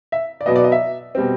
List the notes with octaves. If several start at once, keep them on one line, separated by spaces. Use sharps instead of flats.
E5
D5
B2 F#3 B3 D#5
D5
D#5
E5
B2 G3 C4